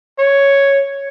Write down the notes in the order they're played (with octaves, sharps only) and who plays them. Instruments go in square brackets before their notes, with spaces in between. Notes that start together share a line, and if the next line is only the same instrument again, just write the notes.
[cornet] C#5